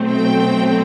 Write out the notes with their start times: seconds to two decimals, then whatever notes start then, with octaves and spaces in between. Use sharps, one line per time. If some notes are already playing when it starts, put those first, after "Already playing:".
Already playing: B2 F#3 A3 C4
0.10 G5